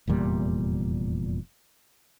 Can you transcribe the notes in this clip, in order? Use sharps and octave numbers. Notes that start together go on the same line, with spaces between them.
F1 E2 A#2 G3